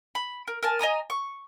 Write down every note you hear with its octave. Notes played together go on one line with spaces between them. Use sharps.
B5
A#4
A#4 G#5 A5
D#5 G#5 A#5 D#6
C#6